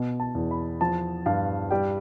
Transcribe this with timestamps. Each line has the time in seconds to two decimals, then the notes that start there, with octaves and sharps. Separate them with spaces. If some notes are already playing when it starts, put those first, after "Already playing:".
Already playing: B2
0.20 A5
0.35 E2
0.51 B5
0.81 F3 A5
1.26 G2 F5
1.70 G3 G5